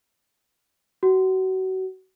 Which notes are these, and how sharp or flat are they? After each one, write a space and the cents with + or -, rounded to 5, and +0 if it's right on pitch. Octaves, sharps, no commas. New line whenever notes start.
F#4 +30